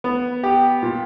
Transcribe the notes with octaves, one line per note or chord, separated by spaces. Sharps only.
B3
G4
A#2